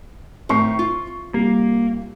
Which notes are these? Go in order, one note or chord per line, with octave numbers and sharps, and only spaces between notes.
A2 D#3 C4 C#6 C7
F4
C2 A#3